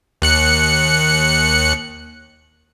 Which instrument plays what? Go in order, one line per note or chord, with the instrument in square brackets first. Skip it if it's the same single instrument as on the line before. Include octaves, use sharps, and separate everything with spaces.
[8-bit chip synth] D#2 F#6 C#7